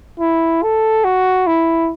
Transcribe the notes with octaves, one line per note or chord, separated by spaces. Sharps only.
E4
A4
F#4
E4